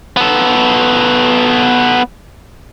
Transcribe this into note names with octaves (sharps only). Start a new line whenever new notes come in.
B3 A4